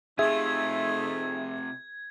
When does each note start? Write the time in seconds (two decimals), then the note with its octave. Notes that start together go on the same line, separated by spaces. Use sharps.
0.19 C3 A3 D#4 F4 G#4 E5 G#6